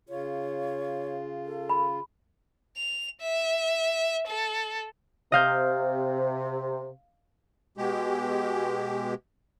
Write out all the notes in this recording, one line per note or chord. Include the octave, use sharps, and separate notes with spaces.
C#3 F4 C#5
A4
B5
F7
E5
A4
C3 D#5 F5 G6
B2 G#3 G4